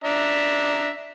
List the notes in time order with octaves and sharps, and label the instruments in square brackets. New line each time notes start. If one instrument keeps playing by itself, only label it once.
[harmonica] D4 E5 A#5